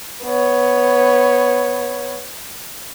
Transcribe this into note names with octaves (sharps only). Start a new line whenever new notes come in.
B3 C#5